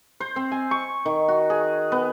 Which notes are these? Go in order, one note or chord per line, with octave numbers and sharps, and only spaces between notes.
C5
C4
G#5
C#6
D#3
F#4
G#4
B3